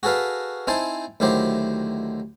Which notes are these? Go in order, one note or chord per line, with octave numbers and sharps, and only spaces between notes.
F#4 G#4 A4 B4 F5
C4 D#4 E4 C5 G#5 A5
D2 D#3 F#3 E4 G4 C5